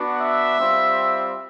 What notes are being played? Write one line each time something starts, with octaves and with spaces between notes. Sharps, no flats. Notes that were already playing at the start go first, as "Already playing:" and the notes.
Already playing: B3 D4 F#4
E5
G3 C4 F4